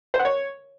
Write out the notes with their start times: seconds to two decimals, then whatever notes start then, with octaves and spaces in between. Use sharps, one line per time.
0.14 C5
0.19 F#5
0.25 C#5